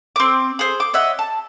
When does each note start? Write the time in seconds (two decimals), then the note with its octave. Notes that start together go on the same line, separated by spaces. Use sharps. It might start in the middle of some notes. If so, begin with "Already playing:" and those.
0.16 C4 D6
0.59 G#4 C5
0.80 D6
0.94 C#5 D#5 E5 F#5
1.19 A5